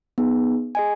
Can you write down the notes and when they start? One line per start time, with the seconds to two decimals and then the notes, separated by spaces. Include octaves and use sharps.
0.18 B3 D#4 G#4
0.75 G#4 D#5 G#5